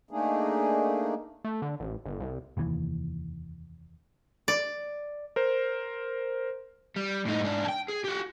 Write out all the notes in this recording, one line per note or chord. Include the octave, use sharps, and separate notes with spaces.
A3 A#3 D4 D#4 G#4
A3
D3
A1
G1
C2
F1 D#2 C3 E3
D5
A#4 C5
G3
A2 D#4
G#2 D4
G5 A5
G#4
F#4 G4